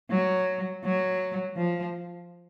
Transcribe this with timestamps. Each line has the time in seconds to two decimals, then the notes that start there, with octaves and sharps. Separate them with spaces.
0.11 F#3
0.84 F#3
1.57 F3